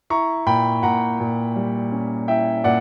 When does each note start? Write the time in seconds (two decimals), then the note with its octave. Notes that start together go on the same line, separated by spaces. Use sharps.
0.10 E4 A#5 C#6
0.46 A#2 G5 B5
0.83 A#2 F#5 A#5
1.20 A#2
1.56 G3
1.92 C#4
2.28 E4 E5 G5
2.64 A#2 D5 F#5